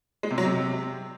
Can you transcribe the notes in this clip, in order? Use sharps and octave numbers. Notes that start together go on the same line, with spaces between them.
G#3
C3
F#3
C3